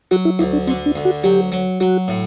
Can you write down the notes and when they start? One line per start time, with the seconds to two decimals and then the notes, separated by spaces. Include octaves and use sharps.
0.11 F#3 F#4
0.25 E4
0.39 D2 E4
0.53 D4
0.67 D3 C4
0.86 D4
0.96 D2
1.05 F#4
1.24 F#3 G4
1.52 F#3
1.80 F#3 F#4
2.08 A2